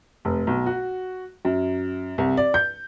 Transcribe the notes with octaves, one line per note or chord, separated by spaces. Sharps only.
F1
B1
F#4
F#2
C2
D5
G6